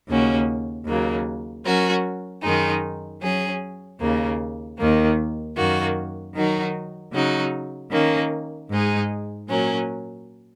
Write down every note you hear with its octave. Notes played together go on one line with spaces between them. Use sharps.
D#2 C#3 A#3 C#4 F#4
D#2 C#3 F#3 A#3
F#3 C#4 F#4 A#4
F#2 D#3 G#3 D#4
F#3 C#4 G#4
D#2 C#3 A#3
D#2 D#3 A#3
F#2 D#3 A#3 F#4
D#3 F#3 D#4 F#4 A#4
C#3 F#3 D#4 F#4
D#3 A#3 C#4
G#2 G#3 D#4 G#4
A#2 F#3 C#4 A#4